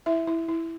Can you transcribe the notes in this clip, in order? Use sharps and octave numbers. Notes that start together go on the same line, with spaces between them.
E4 E5
E4
E4